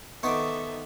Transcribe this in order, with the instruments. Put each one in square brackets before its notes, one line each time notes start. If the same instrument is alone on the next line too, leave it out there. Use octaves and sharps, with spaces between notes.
[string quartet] D#3 A4 E5 [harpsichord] B3 D#4 C5 [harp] C#6 D6